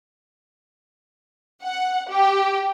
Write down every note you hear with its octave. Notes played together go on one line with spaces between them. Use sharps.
F#5
G4